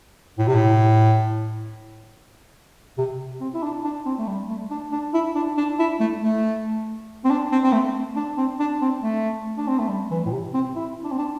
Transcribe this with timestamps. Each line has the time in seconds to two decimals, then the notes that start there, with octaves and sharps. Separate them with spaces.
0.39 A2
0.48 C3
0.55 A2
2.98 C3
3.41 C4
3.54 E4
3.63 D4
3.84 D4
4.06 C4
4.19 A3
4.27 G3
4.49 A3
4.71 D4
4.92 D4
5.14 E4
5.35 D4
5.57 D4
5.79 E4
6.00 A3
6.22 A3
7.24 C4
7.30 D4
7.52 C4
7.64 C4
7.72 A3
8.16 D4
8.38 C4
8.59 D4
8.81 C4
9.03 A3
9.58 D4
9.68 C4
9.79 A3
9.89 G3
10.11 E3
10.26 A2
10.32 C3
10.54 C4
10.76 E4
11.04 D4
11.12 C4
11.19 D4